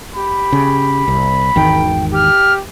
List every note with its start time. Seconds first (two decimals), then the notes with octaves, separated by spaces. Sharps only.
0.15 G4 B5
0.52 C#3
1.08 C2
1.56 G#1 E2 D#3 G5
2.13 G4 F6